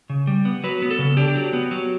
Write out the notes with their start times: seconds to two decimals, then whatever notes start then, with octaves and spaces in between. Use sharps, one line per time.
0.10 C#3
0.27 G3
0.45 B3
0.64 F#3 B4
0.82 B3
0.91 A4
0.99 C#3
1.17 D4 G4
1.35 F#3
1.53 B3
1.71 F#3